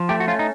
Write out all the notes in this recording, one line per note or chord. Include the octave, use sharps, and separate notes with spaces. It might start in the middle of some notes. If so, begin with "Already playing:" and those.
Already playing: F3
A3 G4
F#4
C#4 F4
D#4